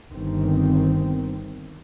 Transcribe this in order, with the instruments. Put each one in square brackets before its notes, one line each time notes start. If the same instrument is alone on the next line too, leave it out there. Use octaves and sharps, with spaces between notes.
[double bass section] G1 D#3 C4